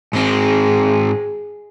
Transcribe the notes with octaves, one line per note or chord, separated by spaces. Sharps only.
G#2 G#3 C4